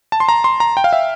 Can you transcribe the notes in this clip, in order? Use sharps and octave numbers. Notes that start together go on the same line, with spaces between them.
A5
C6
A#5
C6
A#5
G5
F5
E5